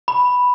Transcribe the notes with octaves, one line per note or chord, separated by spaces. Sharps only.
B5